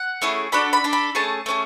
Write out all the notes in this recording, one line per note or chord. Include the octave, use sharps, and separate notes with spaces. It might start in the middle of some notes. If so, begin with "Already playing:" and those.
Already playing: F#5
A3 C#4 E4 G#4
D4 F#4 A4 B5
B5
D4 A4
B5
A3 C#4 G#4 A5
A3 C#4 G#4